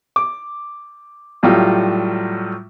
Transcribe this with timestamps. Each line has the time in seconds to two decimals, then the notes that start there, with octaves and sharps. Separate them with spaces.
0.16 D6
1.43 A2 F#3 G3 F4